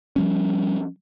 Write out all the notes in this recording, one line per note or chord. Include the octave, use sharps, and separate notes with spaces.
F3 G3 C#4